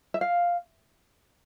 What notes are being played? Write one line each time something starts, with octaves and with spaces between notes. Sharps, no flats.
E5
F5